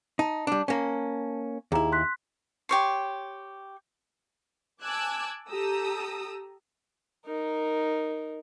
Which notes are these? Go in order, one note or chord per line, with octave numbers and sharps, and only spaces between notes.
D#4 A5
G3 D4
A#3 C#4
D#2 E4 G#4 A#5
C6 F#6 B6
G4 C#5 C6
G#5 A5 D6 E6 F#6 G#6
G4 A4 A#5 D#6 E6
D#4 A#4